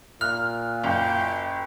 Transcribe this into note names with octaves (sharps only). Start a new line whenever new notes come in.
A#2 F6 F#6
F#1 G5